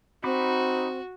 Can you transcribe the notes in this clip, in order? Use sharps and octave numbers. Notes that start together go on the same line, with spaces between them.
C4 D#4 F#4 B5 D6